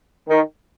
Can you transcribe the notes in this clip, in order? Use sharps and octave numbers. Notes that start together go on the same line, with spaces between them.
D#3